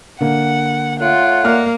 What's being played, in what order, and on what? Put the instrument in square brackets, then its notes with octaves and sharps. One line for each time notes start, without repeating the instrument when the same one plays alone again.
[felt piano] D3 A#3 [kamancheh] F#5
[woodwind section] A3 C#5 F#5 [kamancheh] F4
[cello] A#3 [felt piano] D5 F6